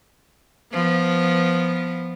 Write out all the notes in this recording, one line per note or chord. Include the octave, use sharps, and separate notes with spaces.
F3 B3